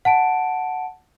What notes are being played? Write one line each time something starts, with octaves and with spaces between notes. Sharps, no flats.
F#5 A5 D7